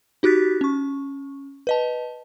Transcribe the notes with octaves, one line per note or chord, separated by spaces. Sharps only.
D#4 F#4 G4 F#6 A6 B6
C#4 C#6
B4 D#5 A5